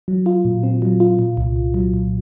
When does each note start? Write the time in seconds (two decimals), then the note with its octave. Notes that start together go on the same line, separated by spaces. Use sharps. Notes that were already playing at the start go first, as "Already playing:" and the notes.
0.08 F#3
0.26 F4
0.45 A#2
0.63 C4
0.82 F#3
1.00 F4
1.19 A#2
1.37 C2
1.56 C2
1.74 F#3
1.94 A#2